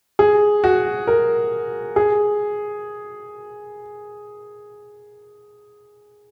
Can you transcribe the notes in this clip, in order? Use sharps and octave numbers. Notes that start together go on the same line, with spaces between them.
G#4
F#4
A#4
G#4